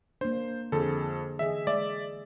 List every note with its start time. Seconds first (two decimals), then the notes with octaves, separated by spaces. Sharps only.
0.21 A#3 D4 C5
0.72 F2 D3 G#4 A4
1.39 E3 G#4 D#5 E5
1.67 G#3 D5 E5